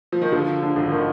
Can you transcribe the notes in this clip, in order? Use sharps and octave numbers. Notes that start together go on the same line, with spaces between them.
F3
D#3
D3 F3
D3
G#1
D#3